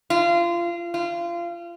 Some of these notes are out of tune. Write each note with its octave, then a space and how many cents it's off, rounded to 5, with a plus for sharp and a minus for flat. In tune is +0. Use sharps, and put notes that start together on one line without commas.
F4 -25
F4 -25